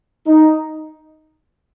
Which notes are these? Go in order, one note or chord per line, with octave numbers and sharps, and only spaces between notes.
D#4